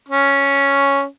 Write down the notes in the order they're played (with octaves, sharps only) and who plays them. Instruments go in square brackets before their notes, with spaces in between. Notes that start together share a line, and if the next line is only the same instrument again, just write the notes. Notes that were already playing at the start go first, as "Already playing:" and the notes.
[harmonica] C#4